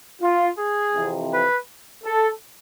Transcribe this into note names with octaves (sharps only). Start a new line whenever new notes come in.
F4
G#4
F2 C3 E3
B4
A4